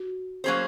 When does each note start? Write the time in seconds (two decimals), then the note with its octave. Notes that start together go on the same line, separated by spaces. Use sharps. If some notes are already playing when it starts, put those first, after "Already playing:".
Already playing: F#4
0.44 F#3 A#3 C#4 G#4 C5